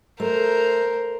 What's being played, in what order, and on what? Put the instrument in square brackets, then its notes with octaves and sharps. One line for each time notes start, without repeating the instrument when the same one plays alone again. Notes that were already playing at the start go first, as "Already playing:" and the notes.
[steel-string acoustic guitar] A3 [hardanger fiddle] A#4 C5